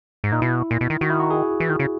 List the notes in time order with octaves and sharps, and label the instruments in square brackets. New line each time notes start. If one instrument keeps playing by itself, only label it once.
[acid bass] G#2
[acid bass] A#2 [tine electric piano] D#4
[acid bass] B2 [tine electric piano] E4
[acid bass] A#2
B2
D#3
[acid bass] D#3 [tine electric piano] F#4
[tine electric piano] E4
F#4
G#4
[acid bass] E3
D#3
C#3